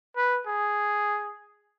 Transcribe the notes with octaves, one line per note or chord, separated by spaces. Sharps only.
B4
G#4